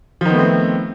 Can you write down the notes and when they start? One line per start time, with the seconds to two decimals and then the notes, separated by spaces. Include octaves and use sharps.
0.21 F3
0.25 D#3
0.30 B3
0.34 A3
0.39 C4